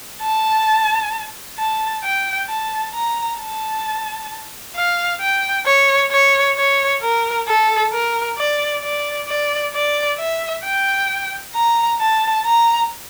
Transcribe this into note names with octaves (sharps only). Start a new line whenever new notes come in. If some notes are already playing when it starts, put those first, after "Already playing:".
A5
A5
G5
A5
A#5
A5
F5
G5
C#5
C#5
C#5
A#4
A4
A#4
D5
D5
D5
D5
E5
G5
A#5
A5
A#5